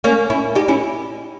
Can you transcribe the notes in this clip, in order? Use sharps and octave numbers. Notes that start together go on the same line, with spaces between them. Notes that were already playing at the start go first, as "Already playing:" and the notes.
A#3 C#4
C#4 E4
D#4 G4
C#4 E4